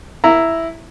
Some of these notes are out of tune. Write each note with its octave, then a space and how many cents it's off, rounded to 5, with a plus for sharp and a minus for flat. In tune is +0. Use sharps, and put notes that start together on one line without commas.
E4 +0 A#5 +0